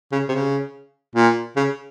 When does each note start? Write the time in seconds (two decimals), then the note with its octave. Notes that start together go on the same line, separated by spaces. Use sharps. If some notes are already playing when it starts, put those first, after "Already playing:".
0.12 C#3
0.28 C3
0.32 C#3
1.15 A#2
1.56 C#3